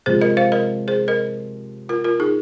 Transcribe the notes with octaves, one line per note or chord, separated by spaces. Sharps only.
C3 F3 G#3 G#4 C5
A#4 D#5
C5 F5
A#4 D#5
G#4 C5
A#4 D#5
F4 A#4
F4 A#4
D#4 G#4